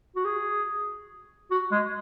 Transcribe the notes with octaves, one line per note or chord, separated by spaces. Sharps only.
F#4
G#4
F#4
G#3